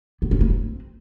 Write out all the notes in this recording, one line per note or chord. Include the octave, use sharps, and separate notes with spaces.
B3
C#4
A#3
C4